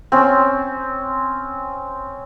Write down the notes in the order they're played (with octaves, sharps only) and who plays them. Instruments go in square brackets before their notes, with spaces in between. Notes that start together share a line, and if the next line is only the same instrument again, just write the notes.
[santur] C4 C#4